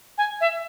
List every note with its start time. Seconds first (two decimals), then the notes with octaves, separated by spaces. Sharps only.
0.18 G#5
0.41 E5